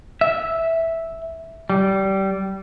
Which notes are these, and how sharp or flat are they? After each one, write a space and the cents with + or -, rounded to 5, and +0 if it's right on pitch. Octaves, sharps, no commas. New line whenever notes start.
E5 -5
G3 -20